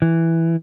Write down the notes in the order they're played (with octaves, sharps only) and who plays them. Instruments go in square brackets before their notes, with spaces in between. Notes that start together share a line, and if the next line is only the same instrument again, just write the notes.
[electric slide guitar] E3